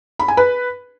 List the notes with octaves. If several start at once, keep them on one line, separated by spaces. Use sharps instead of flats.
B5
G#5
B4